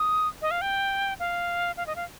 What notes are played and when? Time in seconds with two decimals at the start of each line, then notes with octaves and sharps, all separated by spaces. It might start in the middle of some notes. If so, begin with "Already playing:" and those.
Already playing: D#6
0.42 D#5
0.51 F5
0.61 G5
1.20 F5
1.77 F5
1.87 D#5
1.96 F5